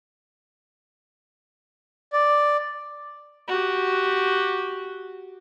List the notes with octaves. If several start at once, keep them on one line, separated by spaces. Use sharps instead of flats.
D5
F#4 G4